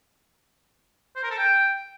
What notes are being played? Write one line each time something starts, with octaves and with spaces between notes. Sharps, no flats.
C5
A#4
A4
G5